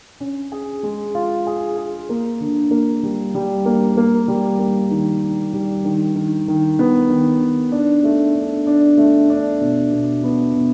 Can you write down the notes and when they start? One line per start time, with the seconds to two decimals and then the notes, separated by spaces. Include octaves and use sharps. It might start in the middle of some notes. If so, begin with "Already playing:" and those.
0.20 C#4
0.52 G#4
0.83 G#3
1.15 F4
1.47 G#4
1.77 G#4
2.09 A#3
2.40 D3
2.71 A#3
3.03 G3
3.35 G3
3.66 A#3
3.97 A#3
4.28 G3
4.59 A#3
4.91 D#3
5.22 D#3
5.53 G3
5.85 D#3
6.15 D#3
6.48 D#3
6.79 B3
7.09 D#3
7.41 D#3
7.72 D4
8.04 A3
8.35 D4
8.67 D4
8.98 A3
9.30 D4
9.61 B2
9.92 B2
10.23 B3
10.54 B2